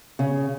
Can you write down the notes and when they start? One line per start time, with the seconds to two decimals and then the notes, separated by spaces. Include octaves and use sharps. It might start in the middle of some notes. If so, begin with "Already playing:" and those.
0.19 C#3